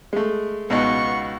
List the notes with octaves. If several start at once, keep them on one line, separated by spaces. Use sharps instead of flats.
G#3 A3
C#2 B2 B3 D#4 C#6